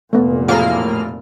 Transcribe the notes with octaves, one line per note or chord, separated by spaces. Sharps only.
F1 A#2 A3 B3
E1 A2 A#3 F4 G#4 F6